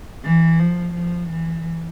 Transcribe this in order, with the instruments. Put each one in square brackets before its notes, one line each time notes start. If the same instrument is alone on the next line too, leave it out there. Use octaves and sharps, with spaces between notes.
[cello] E3
F3
F3
E3